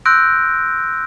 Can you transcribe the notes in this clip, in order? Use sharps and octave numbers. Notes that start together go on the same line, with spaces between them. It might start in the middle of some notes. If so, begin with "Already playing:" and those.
C6 E6 F#6 G6 A#6 D7